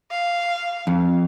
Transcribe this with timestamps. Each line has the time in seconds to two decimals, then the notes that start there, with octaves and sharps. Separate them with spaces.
0.11 F5
0.87 F2